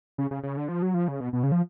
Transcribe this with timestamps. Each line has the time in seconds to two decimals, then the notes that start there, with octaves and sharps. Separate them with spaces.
0.18 C#3
0.31 C#3
0.43 C#3
0.57 D3
0.68 F3
0.82 F#3
0.94 F3
1.08 C#3
1.20 B2
1.33 B2
1.43 C#3
1.52 F3